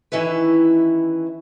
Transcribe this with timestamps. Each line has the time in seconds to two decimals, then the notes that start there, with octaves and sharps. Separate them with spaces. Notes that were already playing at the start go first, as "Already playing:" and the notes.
0.12 D#3 E3 C#4 E4 B4